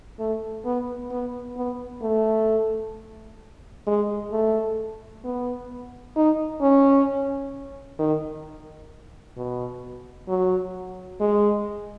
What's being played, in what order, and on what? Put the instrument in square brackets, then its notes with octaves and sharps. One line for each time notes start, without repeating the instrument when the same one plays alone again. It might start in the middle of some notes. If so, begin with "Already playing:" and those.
[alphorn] A3
B3
B3
B3
A3
G#3
A3
B3
D#4
C#4
D#3
B2
F#3
G#3